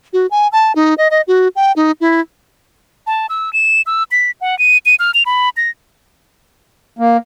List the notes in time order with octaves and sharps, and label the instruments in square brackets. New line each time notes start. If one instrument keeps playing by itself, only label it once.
[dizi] F#4
G#5
A5
D#4
D#5
D#5
F#4
G5
D#4
E4
[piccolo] A5
E6
E7
E6
B6
F#5
D#7
D#7
F6
F7
B5
A#6
[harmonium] A#3